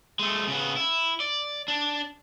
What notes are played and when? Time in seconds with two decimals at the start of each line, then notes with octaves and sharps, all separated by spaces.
0.19 G#3 A3
0.48 C#3 B3
0.76 E4
1.20 D5
1.68 D4